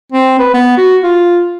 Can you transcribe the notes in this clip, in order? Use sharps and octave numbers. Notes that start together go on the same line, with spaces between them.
C4
B4
B3
F#4
F4